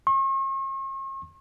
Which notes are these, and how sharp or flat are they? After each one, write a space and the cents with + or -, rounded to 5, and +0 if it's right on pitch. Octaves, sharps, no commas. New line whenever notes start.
C#6 -45